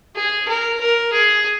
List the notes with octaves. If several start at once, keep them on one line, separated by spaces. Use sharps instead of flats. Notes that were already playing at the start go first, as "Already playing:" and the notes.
G#4
A#4
A#4
G#4